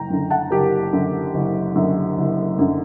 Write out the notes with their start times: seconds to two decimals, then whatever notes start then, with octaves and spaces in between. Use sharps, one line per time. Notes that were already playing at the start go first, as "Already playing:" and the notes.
Already playing: F#1 G5 A#5
0.10 F#2 D3
0.30 F#5 A5
0.51 F#1 G4 A#4
0.93 F#2 D3
1.34 F#1
1.75 F#2 D3
2.18 F#1
2.59 F#2 D3